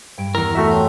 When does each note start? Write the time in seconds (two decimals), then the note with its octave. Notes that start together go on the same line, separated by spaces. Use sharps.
0.18 G2 G#6 D7
0.35 E2 E4 A#4
0.55 A3 F#4 E5
0.71 C#5 G5 A5 C6